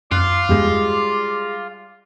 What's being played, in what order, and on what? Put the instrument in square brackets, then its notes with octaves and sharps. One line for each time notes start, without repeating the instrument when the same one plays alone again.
[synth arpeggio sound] F#2 [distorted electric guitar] F4 [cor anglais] D5 [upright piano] F#6 C7
[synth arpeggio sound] E2 G2 [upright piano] G3 G#3